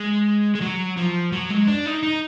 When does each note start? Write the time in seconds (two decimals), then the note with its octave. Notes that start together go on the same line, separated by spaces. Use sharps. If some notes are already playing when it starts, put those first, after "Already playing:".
Already playing: G#3
0.55 G#3
0.61 F#3
0.97 F3
1.32 F#3
1.50 G#3
1.67 D4
1.86 D#4
2.03 D#4